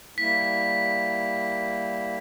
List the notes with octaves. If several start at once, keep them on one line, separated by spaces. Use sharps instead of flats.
G3 A#3 E4 B6